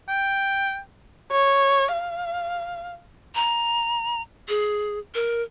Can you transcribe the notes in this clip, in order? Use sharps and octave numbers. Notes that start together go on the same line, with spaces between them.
G5
C#5
F5
A#5
G#4
A#4